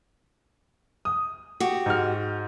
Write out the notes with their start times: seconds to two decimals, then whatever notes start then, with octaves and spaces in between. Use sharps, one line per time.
1.05 D#6
1.60 F#4 G4
1.86 G#2 F6